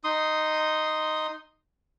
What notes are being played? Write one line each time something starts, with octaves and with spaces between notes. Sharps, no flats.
D#4 C6 D#6